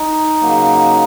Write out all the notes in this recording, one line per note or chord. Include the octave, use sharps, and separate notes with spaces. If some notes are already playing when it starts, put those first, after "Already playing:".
Already playing: D#4
C#3 F#3 A#3